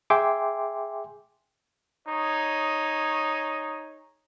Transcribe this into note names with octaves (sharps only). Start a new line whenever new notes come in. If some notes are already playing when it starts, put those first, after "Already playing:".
G#4 E5 G5 G#5 C6 D6
D#4 G#4 C#5